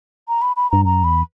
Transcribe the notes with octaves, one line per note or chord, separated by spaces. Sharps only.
A#5
B5
B5
G2 A#5
F#2 A#5
E2 B5